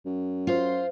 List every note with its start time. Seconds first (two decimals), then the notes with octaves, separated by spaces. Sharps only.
0.06 F#2
0.47 F4 C5